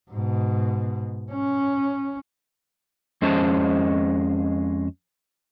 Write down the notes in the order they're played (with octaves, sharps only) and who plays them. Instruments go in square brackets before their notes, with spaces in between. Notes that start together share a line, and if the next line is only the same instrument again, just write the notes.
[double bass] G#2 B2
C#4
[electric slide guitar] F2 G#3 C#4 C5 D#5 A5